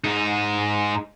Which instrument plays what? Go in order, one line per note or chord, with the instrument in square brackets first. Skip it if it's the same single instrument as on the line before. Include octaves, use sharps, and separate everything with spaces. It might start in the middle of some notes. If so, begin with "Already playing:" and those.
[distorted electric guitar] G#2 D#4